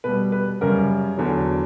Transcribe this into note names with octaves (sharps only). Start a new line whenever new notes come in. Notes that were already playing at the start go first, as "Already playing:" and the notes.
B2 G3 B4
B4
F#2 C#3 G3 A#4
E2 D3 F#3